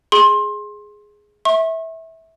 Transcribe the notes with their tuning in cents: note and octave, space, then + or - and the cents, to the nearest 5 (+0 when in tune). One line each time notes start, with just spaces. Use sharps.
G#4 +0 C6 +25
E5 -20 C#6 -45